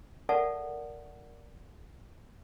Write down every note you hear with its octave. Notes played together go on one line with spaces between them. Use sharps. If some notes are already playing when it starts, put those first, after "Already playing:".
A4 A#4 D5 E5 F#5 A5